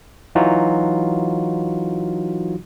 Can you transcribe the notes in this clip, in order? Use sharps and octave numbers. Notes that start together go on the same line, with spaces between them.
E3 F#3 D#4 F4 F#4